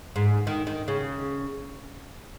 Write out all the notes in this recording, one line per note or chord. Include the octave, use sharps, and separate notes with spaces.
G#2
D#3
D#3
C#3